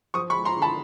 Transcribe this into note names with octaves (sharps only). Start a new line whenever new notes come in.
F3 C#6 D#6
B5 C#6
G#3
A#5 C6
D3
A5 B5